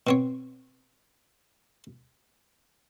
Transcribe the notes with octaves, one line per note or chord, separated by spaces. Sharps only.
B2 C4 C#5